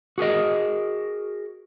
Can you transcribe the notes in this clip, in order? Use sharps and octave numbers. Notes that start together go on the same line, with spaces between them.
F#4 G#4 A#4 D#5